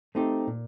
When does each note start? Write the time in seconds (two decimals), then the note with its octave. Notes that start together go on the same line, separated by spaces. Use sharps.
0.15 A3 C4 D#4 G4
0.47 A#2